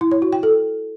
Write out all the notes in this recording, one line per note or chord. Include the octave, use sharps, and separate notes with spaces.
E4
C#5
F#4
G5
A4